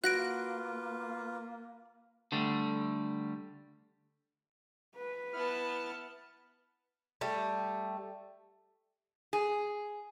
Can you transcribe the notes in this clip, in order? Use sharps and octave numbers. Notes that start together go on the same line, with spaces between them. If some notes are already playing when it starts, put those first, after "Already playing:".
A#3 F4 F#4 B4 F#6 A#6 D7
D3 G3 A3
B4
B3 E4 A5 F6
G3 A3
G#4